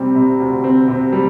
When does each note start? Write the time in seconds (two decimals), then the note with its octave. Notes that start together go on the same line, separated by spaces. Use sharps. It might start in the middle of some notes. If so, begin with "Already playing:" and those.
Already playing: C3 G3 C4
0.15 C3
0.40 D2
0.64 C4
0.88 C3
1.13 G3